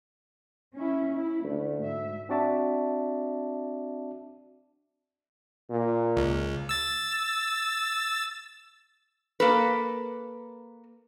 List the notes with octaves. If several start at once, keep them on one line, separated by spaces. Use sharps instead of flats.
C#4 E4
E4
D2 A3
G#2 E5
C4 D4 F#4 D5 E5 A5
A#2
C#2
E6 A6
A#3 A4 B4